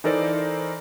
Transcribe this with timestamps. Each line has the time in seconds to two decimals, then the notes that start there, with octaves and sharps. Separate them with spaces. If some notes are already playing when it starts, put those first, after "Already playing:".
0.04 E3 D#4 A4 A#4 C5 D5